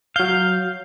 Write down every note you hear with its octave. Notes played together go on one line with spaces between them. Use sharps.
F#3 F5 G6